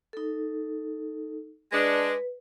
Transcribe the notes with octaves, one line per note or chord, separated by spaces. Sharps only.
D#4 A4
G#3 D4 B4